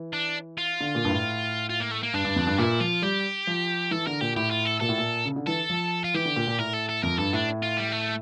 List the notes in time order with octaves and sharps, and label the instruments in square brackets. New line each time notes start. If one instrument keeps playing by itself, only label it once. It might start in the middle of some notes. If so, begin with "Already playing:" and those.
Already playing: [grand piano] E3
[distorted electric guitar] D4
F4
[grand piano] D3
A#2
G2
A2
[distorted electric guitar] F4
A#3
A3
A#3
[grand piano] G2 [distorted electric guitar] D4
[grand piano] G2
F2
G2
[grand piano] A#2 [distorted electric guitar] E4
[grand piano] F3 [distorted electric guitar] F4
[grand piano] G3 [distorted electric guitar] G4
[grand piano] F3
[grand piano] E3 [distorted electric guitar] A4
[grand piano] D3 [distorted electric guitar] A#4
[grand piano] A#2 [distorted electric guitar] G4
[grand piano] A2 [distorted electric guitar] G4
[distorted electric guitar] F4
A4
[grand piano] A#2 [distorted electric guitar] A4
[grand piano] A2
A#2
C#3
D3
[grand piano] E3 [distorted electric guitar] A4
[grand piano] F3
[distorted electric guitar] F4
[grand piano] E3 [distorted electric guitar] G4
[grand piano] D3
A#2
A#2
[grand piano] A2 [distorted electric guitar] A#4
[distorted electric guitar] A4
A4
[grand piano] F2 [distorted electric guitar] A#4
[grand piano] G2 [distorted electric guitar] A4
[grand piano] A2 [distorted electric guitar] D4
[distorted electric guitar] F4
G3
A3